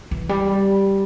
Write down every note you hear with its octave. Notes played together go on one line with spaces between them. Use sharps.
E3
G3